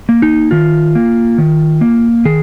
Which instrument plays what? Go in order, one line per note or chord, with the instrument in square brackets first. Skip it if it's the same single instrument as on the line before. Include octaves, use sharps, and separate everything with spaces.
[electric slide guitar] A#3
D#4
D#3 F4
A#3
D#3
A#3
D#3 G#4